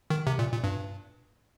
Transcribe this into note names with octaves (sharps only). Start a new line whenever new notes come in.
D#3
C3
A#2
A#2
G2